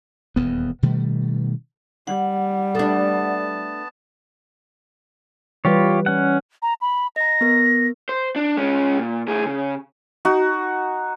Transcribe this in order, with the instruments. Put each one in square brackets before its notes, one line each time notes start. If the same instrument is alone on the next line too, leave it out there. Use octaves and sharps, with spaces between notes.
[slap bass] D#1 E2 B3
B2 D#3 G3 A3
[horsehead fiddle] G3 [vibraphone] F#5
[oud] A3 D4 [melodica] B3 A5
[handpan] E3 G3 B4 [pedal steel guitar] F4 G4 C#5
[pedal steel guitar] C#4 F#5
[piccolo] A#5
B5
[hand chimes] D#5 A#5 [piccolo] A#6
[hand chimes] B3 A#4
[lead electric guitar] C5
D4
G#3 C#4
A#2
A2 G#4
C#3
[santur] D#4 F#4